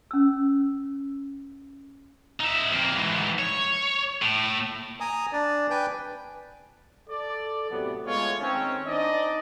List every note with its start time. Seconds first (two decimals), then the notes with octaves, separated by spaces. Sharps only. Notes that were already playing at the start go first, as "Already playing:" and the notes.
0.11 C#4 E6
2.40 D#4 E5
2.71 F2 A#3
2.95 G#2 E3
3.39 C#5
4.22 A2
5.00 G#5 A#5 D#6
5.33 D4 D5
5.70 B4 G5 G#5 G6
7.09 A4 D5
7.69 A2 C3 F#3 B3
8.06 G#3 A3 B3 F4 C#5
8.40 D#3 C4 C#4
8.86 D4 D#4 C5 D5 D#5